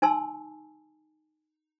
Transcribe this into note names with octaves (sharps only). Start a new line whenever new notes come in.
D#4 G#5 A5 C6 E6